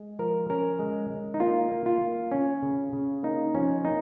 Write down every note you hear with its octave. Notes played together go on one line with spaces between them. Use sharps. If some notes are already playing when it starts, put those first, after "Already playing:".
Already playing: G#3
F3 A#4
C#4 A#4
G#3
G#3
D#4
A#3 F4
A#3
F4
A#3
C#4
C#3
C#3
A#3 D#4
F3 C#4
A#3 D#4